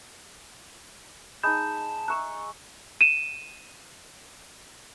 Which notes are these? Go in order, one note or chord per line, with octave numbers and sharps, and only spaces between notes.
G#3 D#4 A5 B5 D#6 G6
E5 A#5 C#6 F#6
D#7 E7